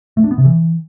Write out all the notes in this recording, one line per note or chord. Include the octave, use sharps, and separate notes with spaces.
A3
D4
B3
C3
E3